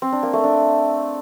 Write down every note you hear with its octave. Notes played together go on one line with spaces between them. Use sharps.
C4
D4
A#3
A3
D4